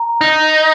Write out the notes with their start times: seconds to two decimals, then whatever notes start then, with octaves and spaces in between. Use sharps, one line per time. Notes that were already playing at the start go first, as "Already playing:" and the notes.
Already playing: A#5
0.21 D#4